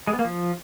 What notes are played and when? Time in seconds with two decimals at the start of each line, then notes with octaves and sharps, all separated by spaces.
0.07 G#3
0.13 B3
0.19 A#3
0.25 F3